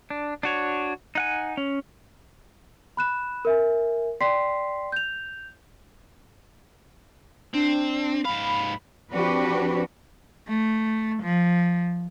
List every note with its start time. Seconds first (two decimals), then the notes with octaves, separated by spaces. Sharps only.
0.10 D4
0.43 D4 F#4 C#5
1.15 D#4 F#5 G#5
1.57 C#4
2.97 B5 F#6 E7
3.45 A#4 E5 G#5
4.21 D5 G5 C6 B6 C7
4.92 G6 F7
7.54 C4 D4
8.25 G#2 F5 B5
9.12 F3 C4 D4 F#4 G4 B4
10.48 A3
11.22 F3